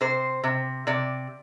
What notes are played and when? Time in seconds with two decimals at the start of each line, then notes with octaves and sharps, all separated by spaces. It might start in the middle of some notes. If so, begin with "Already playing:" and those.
0.01 C3 C5
0.44 C3
0.87 C3 D5